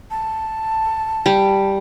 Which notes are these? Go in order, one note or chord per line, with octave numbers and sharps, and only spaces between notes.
A5
G3